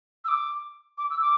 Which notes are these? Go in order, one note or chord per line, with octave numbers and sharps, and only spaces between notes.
E6
D6
D6
E6
D6